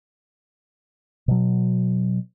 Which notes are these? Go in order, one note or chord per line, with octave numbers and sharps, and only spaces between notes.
B2 F#3